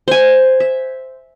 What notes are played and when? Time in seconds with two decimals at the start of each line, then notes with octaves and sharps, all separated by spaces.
0.08 C5 G#5
0.60 E5